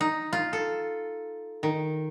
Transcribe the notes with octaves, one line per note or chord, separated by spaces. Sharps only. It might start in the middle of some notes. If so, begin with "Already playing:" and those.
D#4
F4
A4
D#3